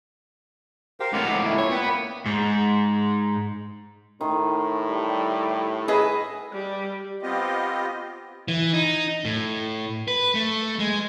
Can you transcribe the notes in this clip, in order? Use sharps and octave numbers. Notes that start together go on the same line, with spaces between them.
G4 A#4 C5 F5
C#2 A2 F#5 A#5 D6
A#2 E4
C#5
B3 B4 G5
A#3 B5
G#2
A2 D#3 C6
G3
G#4 B4 D#5 E5
G3
B3 C4 F4 G4 D#5
E3
D#4
A2
B4
A3
G#3